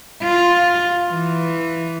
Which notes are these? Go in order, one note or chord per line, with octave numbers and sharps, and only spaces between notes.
F4
E3